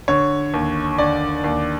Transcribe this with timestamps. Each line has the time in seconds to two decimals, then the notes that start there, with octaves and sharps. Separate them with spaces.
0.08 D3 C#5
0.54 D#2
0.98 D3 D5
1.44 D#2